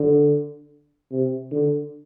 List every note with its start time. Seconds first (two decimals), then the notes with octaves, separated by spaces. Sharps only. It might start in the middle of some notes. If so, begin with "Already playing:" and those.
Already playing: D3
1.11 C3
1.51 D3